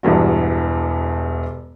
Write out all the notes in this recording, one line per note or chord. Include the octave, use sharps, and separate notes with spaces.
E1 E2 G2 F#4